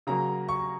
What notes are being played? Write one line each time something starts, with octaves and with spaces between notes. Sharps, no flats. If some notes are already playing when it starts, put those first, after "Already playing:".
C#3 F#3 A#3 A#5
C#6